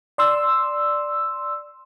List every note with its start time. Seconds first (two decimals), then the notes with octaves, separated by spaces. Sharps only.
0.18 D5 C6 E6